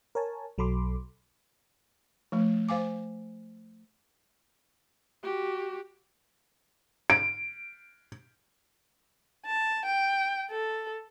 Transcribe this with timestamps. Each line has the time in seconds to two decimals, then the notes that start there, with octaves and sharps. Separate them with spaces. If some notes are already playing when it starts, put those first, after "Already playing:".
0.15 A#4 C#5 G#5 A5
0.58 B1 F#3 A4 B5 C6 D6
2.32 F3 A3
2.69 C5 F5 G#5 D6
5.23 F#4 G4
7.10 D7
9.46 A5
9.86 G5
10.51 A4